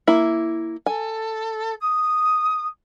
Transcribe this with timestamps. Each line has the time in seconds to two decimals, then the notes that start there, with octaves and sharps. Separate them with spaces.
0.07 A#3 E4
0.86 A4 G#5
1.80 D#6